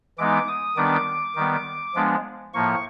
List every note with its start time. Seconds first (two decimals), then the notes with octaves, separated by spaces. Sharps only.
0.18 E3 G#3 B3 D#4 D6
0.48 D#6
0.76 D#3 G3 B3 D4 D6
1.35 D#3 G3 B3
1.95 F3 G#3 B3 D4
2.54 A2 F3 A#3 C#6